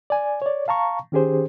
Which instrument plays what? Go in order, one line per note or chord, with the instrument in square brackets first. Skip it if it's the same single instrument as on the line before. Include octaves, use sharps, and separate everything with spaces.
[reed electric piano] D5 G#5
C#5 D5
F5 A5 A#5 C#6
D#3 C#4 G4 G#4 C5